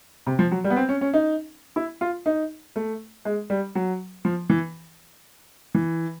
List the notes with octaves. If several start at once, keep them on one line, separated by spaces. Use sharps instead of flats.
C3
F3
F#3
G3
B3
C4
C#4
C#4
D#4
E4
F4
D#4
A3
G#3
G3
F#3
F3
E3
E3